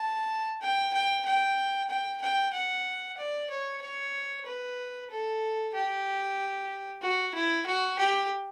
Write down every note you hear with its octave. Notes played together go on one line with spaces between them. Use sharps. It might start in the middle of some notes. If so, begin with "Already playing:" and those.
Already playing: A5
G5
G5
G5
G5
G5
F#5
D5
C#5
C#5
B4
A4
G4
F#4
E4
F#4
G4